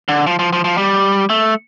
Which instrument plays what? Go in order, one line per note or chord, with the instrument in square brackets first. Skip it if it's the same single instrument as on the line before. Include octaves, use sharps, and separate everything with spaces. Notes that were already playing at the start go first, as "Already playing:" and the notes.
[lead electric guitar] D3
F3
F3
F3
F3
G3
A3